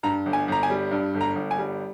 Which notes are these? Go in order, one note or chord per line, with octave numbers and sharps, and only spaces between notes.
G2 A#5
G1
G#5
G1 A#5
G#5
G3
G2
G1
A#5
G1
G#5
G3